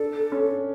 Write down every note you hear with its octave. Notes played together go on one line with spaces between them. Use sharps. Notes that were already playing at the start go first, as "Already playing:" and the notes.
Already playing: D4 A4
C#4